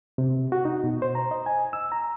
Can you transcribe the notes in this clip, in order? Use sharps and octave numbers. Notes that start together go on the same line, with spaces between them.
C3
F#4
D#4
B2
C5
A#5
D#5
G#5
E6
A#5